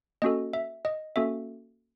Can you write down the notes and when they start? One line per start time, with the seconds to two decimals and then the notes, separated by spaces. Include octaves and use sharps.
0.22 A#3 C#4 F#4 A4 D#5
0.53 E5
0.85 D#5
1.16 A#3 C#4 F#4 A4 E5